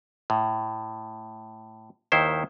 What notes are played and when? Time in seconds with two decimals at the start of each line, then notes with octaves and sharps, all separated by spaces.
0.30 A2
2.12 D#2 D#3 E4 C5